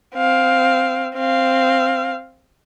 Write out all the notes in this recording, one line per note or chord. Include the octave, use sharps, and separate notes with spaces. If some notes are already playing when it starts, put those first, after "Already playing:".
C4 F5
C4 F5